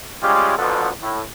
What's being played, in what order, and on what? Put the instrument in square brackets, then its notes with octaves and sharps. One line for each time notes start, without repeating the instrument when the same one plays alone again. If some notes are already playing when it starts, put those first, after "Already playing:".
[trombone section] G3 G#3 C#4 F4 G4
A1 B2 F3 B3 D4 A4
A2